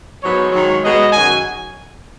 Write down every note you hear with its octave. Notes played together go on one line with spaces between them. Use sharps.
G#2 F#3 B3 C#5
G#2 D#3 F#3
B2 G#3 B3 D#5
F#2 D#3 F#3 G#5